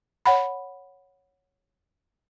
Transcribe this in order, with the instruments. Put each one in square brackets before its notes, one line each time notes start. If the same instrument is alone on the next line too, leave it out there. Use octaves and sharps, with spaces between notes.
[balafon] C#5 F#5 B5